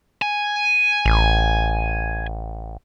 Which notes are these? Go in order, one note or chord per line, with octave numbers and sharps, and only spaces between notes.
G#5
A1